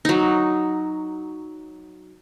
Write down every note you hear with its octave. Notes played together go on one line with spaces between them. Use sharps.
F#3 D#4